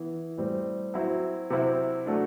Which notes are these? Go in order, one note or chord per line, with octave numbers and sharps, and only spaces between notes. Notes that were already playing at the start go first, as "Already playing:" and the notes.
Already playing: E3 B3 E4
A2 G3 C4
F#3 C4 E4
C3 F#3 C4 E4
F#3 A3 D4